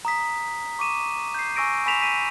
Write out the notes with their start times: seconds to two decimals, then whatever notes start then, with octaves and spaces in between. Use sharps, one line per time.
0.05 A#5 D#6 B6
0.79 C#6 D6 D#7 E7
1.34 G6 C7
1.56 G#5 C#6 E6 A#6 D7 D#7
1.86 G#5 B5 C#6 B6 E7 F7
2.01 B6 D#7